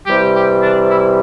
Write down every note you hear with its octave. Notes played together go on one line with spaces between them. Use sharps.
C3 E3 G3 G4
G4
D4
E4